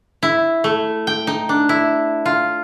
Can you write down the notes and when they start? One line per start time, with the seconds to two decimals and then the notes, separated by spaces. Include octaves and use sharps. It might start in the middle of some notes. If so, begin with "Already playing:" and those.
0.23 E4
0.64 A3
1.07 G5
1.27 D#4
1.49 D4
1.69 E4
2.26 F4